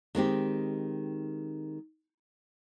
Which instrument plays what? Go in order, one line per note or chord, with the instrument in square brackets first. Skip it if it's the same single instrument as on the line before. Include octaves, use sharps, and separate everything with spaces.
[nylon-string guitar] D#3 G#3 C4 G4